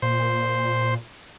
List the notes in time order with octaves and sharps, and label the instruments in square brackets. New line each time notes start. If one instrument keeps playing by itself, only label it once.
[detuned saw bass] A#2 [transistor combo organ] C5